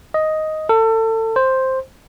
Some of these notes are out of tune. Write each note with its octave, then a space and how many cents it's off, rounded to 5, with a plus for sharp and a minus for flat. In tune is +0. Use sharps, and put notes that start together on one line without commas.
D#5 +5
A4 +30
C5 +5